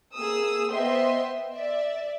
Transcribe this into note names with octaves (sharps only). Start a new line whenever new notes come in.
A#3 G#4 D#6 E6
B3 C5 D#5 E5 G5 C6
D5 E5